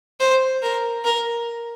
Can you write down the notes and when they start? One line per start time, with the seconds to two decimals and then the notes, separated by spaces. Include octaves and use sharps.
0.20 C5
0.63 A#4
1.05 A#4